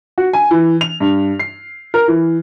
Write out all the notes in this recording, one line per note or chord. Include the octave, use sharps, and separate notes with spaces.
F#4
G#5
E3
F7
G2
C7
A#4
E3